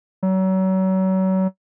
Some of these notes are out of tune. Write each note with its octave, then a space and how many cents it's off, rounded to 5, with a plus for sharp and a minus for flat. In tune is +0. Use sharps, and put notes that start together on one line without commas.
F#3 +35